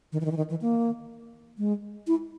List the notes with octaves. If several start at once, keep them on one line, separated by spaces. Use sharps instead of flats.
D#3
E3
D#3
E3
D#3
E3
A#3
G#3
E4